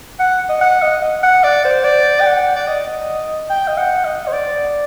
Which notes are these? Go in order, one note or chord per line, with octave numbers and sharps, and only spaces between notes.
F#5
D#5
F#5
D#5
F#5
D5
C5
D5
G5
F#5
D5
D#5
G5
D#5
F#5
D#5
C5
D5